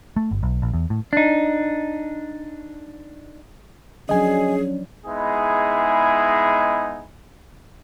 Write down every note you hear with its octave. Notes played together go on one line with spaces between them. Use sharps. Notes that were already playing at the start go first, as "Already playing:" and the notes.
A3
G1
B1
A#1
E2
A2
D4 D#4
F3 F#3 C#4 D4 G#4 D#5 G#5
G#3 B3 D#4 E4 G#4